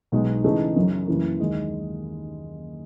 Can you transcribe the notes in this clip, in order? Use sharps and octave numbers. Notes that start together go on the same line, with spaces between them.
B1 B2 G#3 D#4
C#3 E3 A3 D#4 G#4
F#2 C#3 F#3
F#1 F#2 C#3 E3 A3
D#2 D#3 G#3